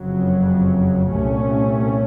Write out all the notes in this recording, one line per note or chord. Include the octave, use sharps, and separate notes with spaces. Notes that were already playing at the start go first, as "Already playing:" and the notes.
Already playing: F#1 F2 C#3 F#3
C2 A#2 A3 C#4